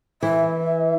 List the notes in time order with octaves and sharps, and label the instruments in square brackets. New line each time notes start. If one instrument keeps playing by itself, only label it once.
[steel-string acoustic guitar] E3 [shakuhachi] E5